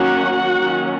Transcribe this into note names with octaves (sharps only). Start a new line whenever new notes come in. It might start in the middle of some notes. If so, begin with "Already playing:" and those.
Already playing: D#3 F#3 A#3 C#4 F#4 F#5
D#3 F#3 A#3 C#4